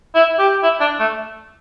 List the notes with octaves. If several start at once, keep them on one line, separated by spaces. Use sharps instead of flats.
E4
G4
E4
D4
A3